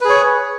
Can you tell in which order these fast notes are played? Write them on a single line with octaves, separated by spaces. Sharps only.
B4 G#4 C#5